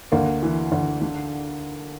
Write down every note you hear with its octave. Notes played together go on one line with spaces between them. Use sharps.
D2 A#3
E3
D2
D3